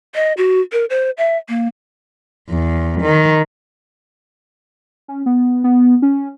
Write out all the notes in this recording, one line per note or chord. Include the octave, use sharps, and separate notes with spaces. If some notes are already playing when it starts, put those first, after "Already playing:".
D#5
F#4
A#4
C5
E5
A#3
E2
D#3
C#4
B3
B3
C#4